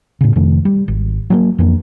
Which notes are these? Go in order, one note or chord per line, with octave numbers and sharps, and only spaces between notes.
A2 C#3
F2 C3 D#3 A3
G3
G#1
F#3 A3 A#3
F2 E3 A#3 D4